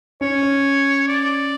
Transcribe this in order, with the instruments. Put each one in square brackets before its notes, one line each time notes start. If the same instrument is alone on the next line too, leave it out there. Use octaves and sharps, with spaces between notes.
[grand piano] C#4 [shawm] C#5
[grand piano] C#4
[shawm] D5